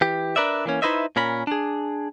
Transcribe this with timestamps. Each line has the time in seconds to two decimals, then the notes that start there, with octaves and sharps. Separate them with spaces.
0.01 E3 G4
0.36 D4 A#4 B4 D5 E5
0.66 E3 A#3 C#4
0.82 D#4 E4 B4 C5 D#5 E5
1.16 A#2 C#4 A#4 B5
1.47 D4 G#4